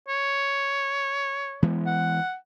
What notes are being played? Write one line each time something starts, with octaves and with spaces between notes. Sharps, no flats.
C#5
E3 G#3 B3
F#5